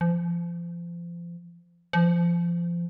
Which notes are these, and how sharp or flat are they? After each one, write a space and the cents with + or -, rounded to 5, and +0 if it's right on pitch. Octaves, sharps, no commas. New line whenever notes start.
F3 -30
F3 -25